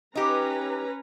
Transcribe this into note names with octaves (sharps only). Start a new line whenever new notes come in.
C#4 D#4 G4 B4 A#5